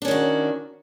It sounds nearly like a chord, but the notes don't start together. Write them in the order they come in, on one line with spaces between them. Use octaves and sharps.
D4 C#4 D#3 F#4